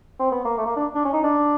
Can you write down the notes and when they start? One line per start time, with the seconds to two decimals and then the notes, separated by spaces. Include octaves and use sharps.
0.20 C4
0.32 B3
0.45 A#3
0.58 A3
0.66 A#3
0.76 D4
0.95 D4
1.05 C#4
1.13 D#4
1.23 D4